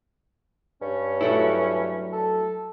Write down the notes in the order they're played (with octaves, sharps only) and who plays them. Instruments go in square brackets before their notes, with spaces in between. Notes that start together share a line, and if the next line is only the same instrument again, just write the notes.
[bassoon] G2 [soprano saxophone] C#4
[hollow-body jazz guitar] F#3 A3 E4
[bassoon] A4